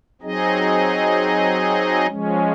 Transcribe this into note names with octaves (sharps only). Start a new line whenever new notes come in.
F#3 C4 D#4 G#4 D#5
F3 G#3 C#4